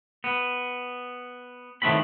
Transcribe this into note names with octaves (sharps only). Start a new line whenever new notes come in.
B3
A2 D#3 A3 B3 C4 B5